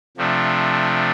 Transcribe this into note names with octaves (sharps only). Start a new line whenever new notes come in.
C3 F3 A3 D4